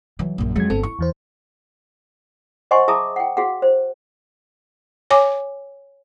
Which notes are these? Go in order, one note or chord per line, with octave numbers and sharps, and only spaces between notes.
E3 F#3
A#1 F#2
F2 F#3 G#3 G#6
G1 C4 A4
E4 C#6
E2 E3 C5
C5 D#5 F#5 G#5 C6 C#6
G#4 E5 A5 A#5 D6 D#6
F#5 G5
F#4 G#4 F5 F#5
C5
C#5 G#5 D6